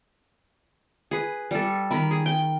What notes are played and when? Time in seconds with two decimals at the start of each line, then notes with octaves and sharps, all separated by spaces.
1.11 G#4 B4
1.51 G3 A4
1.91 D#3 A#4 B5
2.11 G#4
2.26 G5